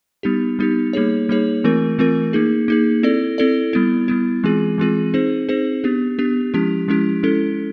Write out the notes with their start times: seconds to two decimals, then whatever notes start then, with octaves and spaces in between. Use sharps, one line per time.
0.23 G3 B3 D#4 G4
0.59 G3 B3 D#4 G4
0.93 G3 A#3 D#4 G#4 C#5
1.29 G3 A#3 D#4 G#4 C#5
1.64 E3 A3 C4 F4 A#4
1.99 E3 A3 C4 F4 A#4
2.33 A#3 D#4 G#4
2.68 A#3 D#4 G#4
3.03 C4 E4 A4 D5
3.38 C4 E4 A4 D5
3.73 G3 B3 E4
4.08 G3 B3 E4
4.44 E3 G#3 C4 F4 G#4
4.78 E3 G#3 C4 F4 G#4
5.14 C4 D#4 G#4 C5
5.49 C4 D#4 G#4 C5
5.84 B3 D4 G4
6.19 B3 D4 G4
6.54 F3 G#3 C#4 E4 G4
6.88 F3 G#3 C#4 E4 G4
7.23 G#3 C#4 E4 A4